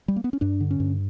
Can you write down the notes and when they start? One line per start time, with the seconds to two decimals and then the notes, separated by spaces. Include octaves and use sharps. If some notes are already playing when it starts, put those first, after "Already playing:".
0.08 G3
0.16 A#3
0.24 B3
0.33 C#4
0.41 G2 D4
0.61 D3
0.71 C#4
0.80 G2